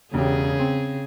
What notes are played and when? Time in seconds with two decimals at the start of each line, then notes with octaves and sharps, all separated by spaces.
0.14 E1 C#3 G4 G#4
0.59 C4